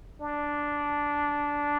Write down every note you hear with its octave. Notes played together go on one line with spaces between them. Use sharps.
D4